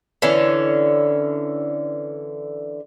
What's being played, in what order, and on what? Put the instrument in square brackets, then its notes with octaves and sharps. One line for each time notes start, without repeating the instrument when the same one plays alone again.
[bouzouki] D3 E3 C#4